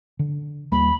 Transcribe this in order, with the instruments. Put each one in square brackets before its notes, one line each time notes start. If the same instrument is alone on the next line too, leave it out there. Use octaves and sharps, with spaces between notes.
[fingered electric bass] D3
[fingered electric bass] D#2 G3 A#3 [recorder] B5